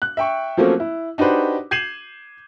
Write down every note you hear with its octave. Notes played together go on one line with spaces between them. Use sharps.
F#6
E5 G5 C#6
F3 F#3 A3 A#3 C4 C#4
E4
D4 D#4 F#4 G4 B4 C5
G6 G#6 C7 D#7 E7 F#7